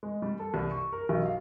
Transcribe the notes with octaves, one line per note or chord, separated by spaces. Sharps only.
G#3
G3
A4
C2
C#6
A#4
B1
F5